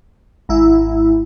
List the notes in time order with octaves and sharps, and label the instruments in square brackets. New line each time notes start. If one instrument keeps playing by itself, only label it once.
[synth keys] G#1 E4